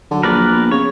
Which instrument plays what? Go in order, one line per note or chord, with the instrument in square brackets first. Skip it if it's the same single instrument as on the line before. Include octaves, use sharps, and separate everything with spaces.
[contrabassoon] D3 [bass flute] F#3
[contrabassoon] A#1 [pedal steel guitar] A#4 B4 D5
[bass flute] B3
[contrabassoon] C#3 [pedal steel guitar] C#5